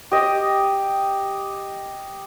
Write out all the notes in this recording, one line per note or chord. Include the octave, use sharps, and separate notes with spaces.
G4 D#5